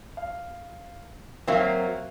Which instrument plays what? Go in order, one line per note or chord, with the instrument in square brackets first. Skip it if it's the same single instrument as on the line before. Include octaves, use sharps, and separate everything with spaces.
[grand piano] F5
[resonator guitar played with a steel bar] F#3 A#3 C4 [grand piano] E5 F5